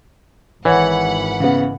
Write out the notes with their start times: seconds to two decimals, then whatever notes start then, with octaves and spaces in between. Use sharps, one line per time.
0.65 G#1 E3 C#5 F#5 B5
1.40 C#3 B3